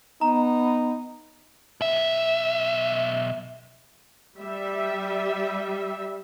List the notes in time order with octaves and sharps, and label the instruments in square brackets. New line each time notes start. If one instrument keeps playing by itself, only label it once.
[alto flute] B3 [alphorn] D#4 [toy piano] A#5
[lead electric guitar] B1 E5
[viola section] G3 E5